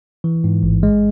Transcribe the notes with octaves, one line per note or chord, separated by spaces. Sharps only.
E3
G#2
A1
G#3